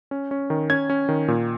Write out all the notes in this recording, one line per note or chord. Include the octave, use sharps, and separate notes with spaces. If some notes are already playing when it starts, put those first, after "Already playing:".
C#4
C#4
D#3
C#4 G#6
C#4
D#3
A#2